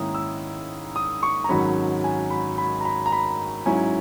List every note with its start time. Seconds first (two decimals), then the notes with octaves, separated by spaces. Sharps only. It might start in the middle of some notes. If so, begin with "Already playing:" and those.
Already playing: G#2 D#3 A#3 C#4 E4 D#6
0.15 E6
0.96 D#6
1.23 C#6
1.44 A#5
1.49 G#1 G#2 F#3 C#4 B5
2.04 G#5
2.30 B5
2.58 B5
2.81 A#5
2.85 B5
3.06 A#5
3.12 B5
3.65 G#2 F#3 C#4 E4 G#5